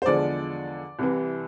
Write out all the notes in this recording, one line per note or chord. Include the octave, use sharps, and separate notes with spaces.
C5
E2 D3 F3 G#3 D5
C2 C3 E3